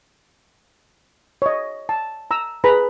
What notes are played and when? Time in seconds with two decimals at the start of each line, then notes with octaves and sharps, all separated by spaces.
1.42 C#5 D#5
1.89 A5
2.31 A#5 E6
2.64 G#4 B4 A#5 B5